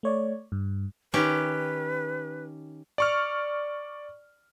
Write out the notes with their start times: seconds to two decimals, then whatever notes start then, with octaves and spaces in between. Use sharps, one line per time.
0.03 A3 C#5 D5
0.52 G2
1.14 D#3 C#4 G4 B4
2.98 D5 C#6 F6